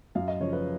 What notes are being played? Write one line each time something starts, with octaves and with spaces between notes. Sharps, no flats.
F#2 F5
D#5
C#3 F3 C#5
B4